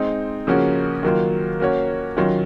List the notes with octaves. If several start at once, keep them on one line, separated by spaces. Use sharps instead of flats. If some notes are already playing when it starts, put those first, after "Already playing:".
Already playing: G#3 C4 D#4
C#3 F3 A#3 C#4 F#4
D#3 F#3 A#3 F4
A#3 C#4 F#4 C#5
D#3 F#3 C#4 F4